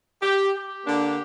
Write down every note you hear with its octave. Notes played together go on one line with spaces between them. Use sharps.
G4
G4
D3 A#3 D4